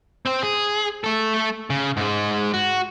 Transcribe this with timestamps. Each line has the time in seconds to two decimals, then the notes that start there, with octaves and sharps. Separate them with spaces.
0.26 C4 C5
0.43 G#4
1.04 A3 A4
1.70 C#3
1.97 G#2 G#3
2.54 F#4